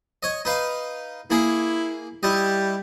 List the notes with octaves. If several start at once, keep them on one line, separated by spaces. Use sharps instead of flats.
C#5 D#5
D#4 B4 F5
A#3 E4 G#4
G3 E4 D#5